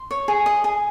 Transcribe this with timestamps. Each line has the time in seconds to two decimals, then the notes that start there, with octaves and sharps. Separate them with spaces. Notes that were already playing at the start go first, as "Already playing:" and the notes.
Already playing: C6
0.11 C#5
0.28 G#4
0.46 D#5 D#6
0.64 G#4